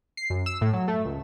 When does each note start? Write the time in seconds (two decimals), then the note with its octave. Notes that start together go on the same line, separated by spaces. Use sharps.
0.17 C7
0.30 F#2
0.46 E6
0.61 A2
0.73 F#3
0.88 A3
1.05 C#2